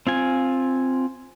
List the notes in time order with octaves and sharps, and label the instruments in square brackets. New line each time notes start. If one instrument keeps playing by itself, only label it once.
[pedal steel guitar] C4 F4 G#5